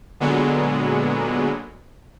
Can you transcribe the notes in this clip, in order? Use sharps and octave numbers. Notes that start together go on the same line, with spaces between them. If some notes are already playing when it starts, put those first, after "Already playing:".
A#2 D3 F#3 G#3 B3